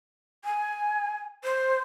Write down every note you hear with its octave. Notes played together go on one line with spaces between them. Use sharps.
G#5
C5